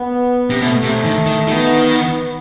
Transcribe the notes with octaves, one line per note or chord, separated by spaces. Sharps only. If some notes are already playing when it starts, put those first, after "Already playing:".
Already playing: B3
C3
B2 A3
C3
D#3
D#3
D#3 B3